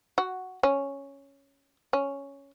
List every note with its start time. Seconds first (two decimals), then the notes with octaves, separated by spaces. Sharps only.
0.18 F#4
0.63 C#4
1.93 C#4